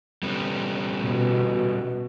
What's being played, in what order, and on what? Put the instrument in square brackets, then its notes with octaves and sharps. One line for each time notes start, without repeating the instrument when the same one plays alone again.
[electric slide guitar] G3 B3 C#4
[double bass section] B2